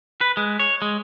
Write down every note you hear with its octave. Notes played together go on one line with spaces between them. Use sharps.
B4
G#3
C#5
G#3